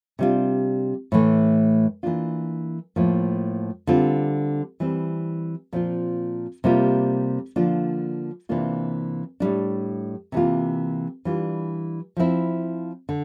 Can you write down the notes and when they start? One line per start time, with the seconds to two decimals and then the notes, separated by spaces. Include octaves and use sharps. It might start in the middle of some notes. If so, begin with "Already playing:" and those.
0.19 C3 G3 D4 F4
1.12 A2 E3 A3
2.03 E3 A#3 D4 F4
2.96 A2 F3 A#3
3.87 D3 G3 C4 F4
4.80 E3 G3 C4
5.73 A#2 F3 C4 F4
6.64 C3 G3 A#3 F4
7.56 D3 F3 A#3 D4 F4
8.49 C3 E3 A#3 D4 F4
9.40 A2 G3 D4
10.32 C3 E3 G3 A#3 F4
11.25 E3 G3 D4 F4
12.17 F3 C4 E4
13.09 D3